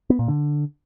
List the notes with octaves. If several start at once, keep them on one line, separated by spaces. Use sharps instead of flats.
B3
A#2
D3